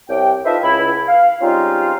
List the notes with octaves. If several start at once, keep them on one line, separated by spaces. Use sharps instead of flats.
C2 C3 G4 C#5 G5
D#4 F4 A4 B4 C5 E5
C#2 E4
F5
G3 G#3 C4 C#4 D#4 F4